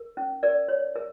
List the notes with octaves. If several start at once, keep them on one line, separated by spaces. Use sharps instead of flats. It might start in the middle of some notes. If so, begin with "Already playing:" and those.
Already playing: A#4
C#4
A#4 D5
C#5
A#4